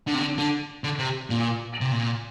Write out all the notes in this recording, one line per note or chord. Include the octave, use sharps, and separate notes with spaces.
D3
C3
D3
D3
D3
C3
A#2
C3
A#2